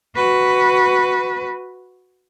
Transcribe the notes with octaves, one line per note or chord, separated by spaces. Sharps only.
F#4 B4